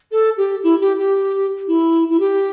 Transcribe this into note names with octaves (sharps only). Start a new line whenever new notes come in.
A4
G4
E4
G4
G4
E4
E4
G4